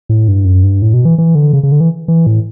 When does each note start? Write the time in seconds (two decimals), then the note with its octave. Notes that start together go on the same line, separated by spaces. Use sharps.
0.09 A2
0.28 G2
0.45 F#2
0.63 G2
0.82 A2
0.94 B2
1.05 E3
1.18 E3
1.35 D3
1.53 C#3
1.63 C#3
1.72 D3
1.80 E3
2.08 E3
2.27 A2